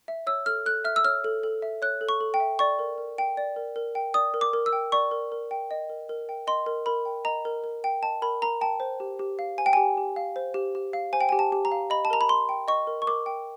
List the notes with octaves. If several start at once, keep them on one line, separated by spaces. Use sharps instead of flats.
E5
C#5 E6
A4 F6
A4 F#6
E5 F6
E6
C#5 F6
A4
A4
E5
C#5 F#6
A4
C#6
A4
G5
E5
D5 C#6
A#4
A#4
G5
D5
A#4
A#4
G5
D5 D#6
A#4
D6
A#4
E6
G5
D5 C#6
A#4
A#4
G5
D#5
A#4
A#4
G5
D#5 C6
A#4
A#4 B5
G5
D#5 A#5
A#4
A#4
G5
D#5 A5
A#4 B5
A#4 A#5
G5 A5
C5
G4
G4
F5
C5 G#5
G5
G4 G#5
G4
F5
C5
G4
G4
F5
C5 G#5
G5
G4 G#5
A5
G4
A#5
F5
D#5 B5
A5
A#4 A#5
B5
A#4 C6
G5
D#5 C#6
A#4
C#6
A#4 D6
G5